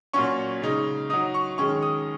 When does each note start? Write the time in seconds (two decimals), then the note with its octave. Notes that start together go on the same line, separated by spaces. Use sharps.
0.13 A#2 F#3 C#4 C#6
0.62 C#3 G#3 D#4
1.10 F#3 D#4 D#6
1.34 C#6
1.58 D#3 G#3 C#4 C#6
1.82 D#6